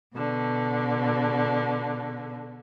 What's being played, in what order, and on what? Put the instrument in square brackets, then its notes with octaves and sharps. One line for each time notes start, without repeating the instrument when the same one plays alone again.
[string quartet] B2 D3